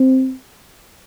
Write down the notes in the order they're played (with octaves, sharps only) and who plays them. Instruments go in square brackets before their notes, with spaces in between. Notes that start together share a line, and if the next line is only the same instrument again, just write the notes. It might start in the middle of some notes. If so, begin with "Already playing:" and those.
Already playing: [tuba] C4